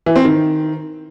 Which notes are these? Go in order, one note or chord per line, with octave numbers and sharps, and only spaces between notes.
E3
C4
D#3